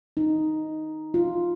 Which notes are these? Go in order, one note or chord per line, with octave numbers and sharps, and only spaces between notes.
D#4
F4